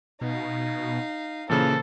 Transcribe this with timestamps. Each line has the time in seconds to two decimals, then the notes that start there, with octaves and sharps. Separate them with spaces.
0.21 B2 D#4 F5
1.50 A#2 C#3 E3 A#3 A4 A#4 C5